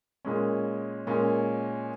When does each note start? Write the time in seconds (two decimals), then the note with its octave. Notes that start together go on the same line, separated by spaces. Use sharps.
0.25 A#2 G#3 C#4
1.07 A#2 G#3 C#4